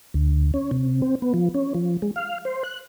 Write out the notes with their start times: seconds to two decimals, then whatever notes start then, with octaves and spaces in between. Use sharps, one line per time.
0.14 D2
0.54 C#4
0.71 C3
1.02 C4
1.22 B3
1.34 F3
1.54 C#4
1.74 F3
2.02 G#3
2.16 F5
2.45 C5
2.64 F#6